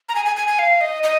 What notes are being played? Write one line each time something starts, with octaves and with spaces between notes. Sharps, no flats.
A#5
G#5
G#5
G#5
G#5
F5
D#5
D#5